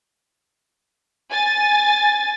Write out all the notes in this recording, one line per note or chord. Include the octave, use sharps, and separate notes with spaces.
G#5 A6